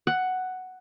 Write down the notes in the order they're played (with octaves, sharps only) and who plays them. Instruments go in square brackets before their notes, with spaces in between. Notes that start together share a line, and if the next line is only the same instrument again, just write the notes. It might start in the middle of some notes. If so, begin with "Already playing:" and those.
[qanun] F#5